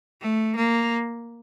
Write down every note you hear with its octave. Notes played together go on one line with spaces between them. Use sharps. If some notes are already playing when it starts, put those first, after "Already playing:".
A3
A#3